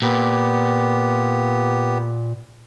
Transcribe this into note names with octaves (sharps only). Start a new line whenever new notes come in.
A#2 B3 G4